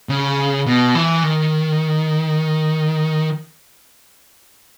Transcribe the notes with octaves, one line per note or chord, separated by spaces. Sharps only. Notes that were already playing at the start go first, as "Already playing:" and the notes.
C#3
B2
E3
D#3